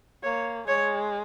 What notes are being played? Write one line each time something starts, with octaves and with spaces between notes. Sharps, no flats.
A#3 C#5
G#3 C#5